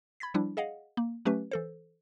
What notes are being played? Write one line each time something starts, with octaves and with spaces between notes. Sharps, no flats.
B5 G#6 A6 B6
F3 G3 D4 E4
G#4 D#5 F5 F#5
A#3
F#3 A3 C#4 G4 B4
E3 A4 C5